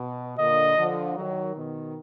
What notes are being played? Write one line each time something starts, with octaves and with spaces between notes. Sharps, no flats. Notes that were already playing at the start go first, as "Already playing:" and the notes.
Already playing: B2
A#2 D3 D#5
D3 F3
D#3 F#3
B2 D#3